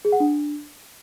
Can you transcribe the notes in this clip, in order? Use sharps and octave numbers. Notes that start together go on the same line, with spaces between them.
G#4
F#5
D4